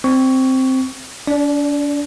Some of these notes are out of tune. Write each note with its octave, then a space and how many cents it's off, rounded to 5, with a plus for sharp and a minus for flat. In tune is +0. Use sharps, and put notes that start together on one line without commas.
C4 +0 C#6 +15
D4 -40 D5 +0